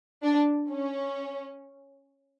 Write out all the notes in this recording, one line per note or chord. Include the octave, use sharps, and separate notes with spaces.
D4
C#4